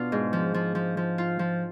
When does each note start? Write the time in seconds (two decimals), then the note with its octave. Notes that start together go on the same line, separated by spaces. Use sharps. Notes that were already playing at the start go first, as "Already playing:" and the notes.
Already playing: B2 D4 F4
0.12 G#2
0.33 F3
0.54 F3
0.75 F3
0.97 F3
1.18 F4
1.39 F3